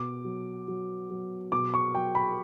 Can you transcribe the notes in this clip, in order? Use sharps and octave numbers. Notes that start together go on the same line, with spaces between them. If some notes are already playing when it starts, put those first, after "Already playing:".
Already playing: B2 D6
F#3
F#3
F#3
B2 D6
C#6
F#3 G5
B5